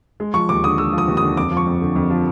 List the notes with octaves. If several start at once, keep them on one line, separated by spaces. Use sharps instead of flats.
G#3
F3 C#6
D#2 D6
D3 D#6
G#3 E6
F3
D#6
D#2
D3 D#6
F2 D6
F3
C#6
F2
D3
F2
F3